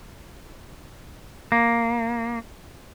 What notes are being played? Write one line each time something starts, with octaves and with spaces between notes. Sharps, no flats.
A#3